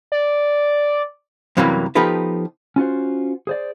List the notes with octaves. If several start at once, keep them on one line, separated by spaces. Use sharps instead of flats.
D5
F#2 C3 E3 F#3 G3 A#3
F3 B3 D#4 G4 A4 B4
C#4 F4 F#4 C5
G#4 C5 D5